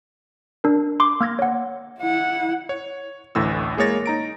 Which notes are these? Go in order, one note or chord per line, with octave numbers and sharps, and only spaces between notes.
D4 A#4
C6 D6
A#3 F6 G#6 A#6
C#5 F#5
E4 F#5
C#5
A1 D2 A2 E3 E6
G#3 A#3 G#4 C#5 A6 A#6
D#4 A#5 D7